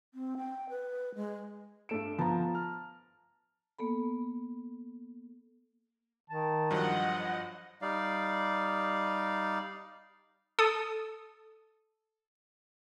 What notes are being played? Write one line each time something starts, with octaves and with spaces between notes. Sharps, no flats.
C4
G5
B4
G#3
G2 A3 D7 E7
F3 B3 A5 A#5
F6
A#3 B3 A4 B5
D#3 A5
G2 F3 F#3 F4 D#5 F#5
G3 D#4 D5 F5
A4 D#6